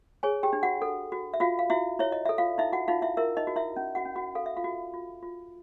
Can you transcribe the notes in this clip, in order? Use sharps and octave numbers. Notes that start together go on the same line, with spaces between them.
G#4 C#5 G#5
G4 G5
D4
F#4 F#5
A4
F#4
E5
F4 F#4 F5
F5
E4 F#4 E5
E4 C#5 E5
D#5
A4 E5
F4 F5
D#4 E4 E5
F#4 F#5
D#4 F4 F5
E4 E5
E4 A#4 E5
D#4 D#5
F#4
E4 E5
C#4
F#4 F#5
C#4
F#4 F#5
A4 F5
E5
F4 F5
F#4
F4
F4